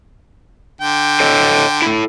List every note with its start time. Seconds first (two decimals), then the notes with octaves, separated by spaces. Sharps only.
0.81 D3 G5
1.20 A4 C#5 D#5
1.82 E4 A4